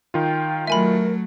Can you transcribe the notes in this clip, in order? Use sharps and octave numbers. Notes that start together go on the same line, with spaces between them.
D#3 F4 G5
F#3 A3 A#4 E5 G#5 B5